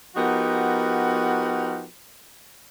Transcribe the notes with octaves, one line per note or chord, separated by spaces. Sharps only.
F3 B3 D#4 F#4 G4 A#4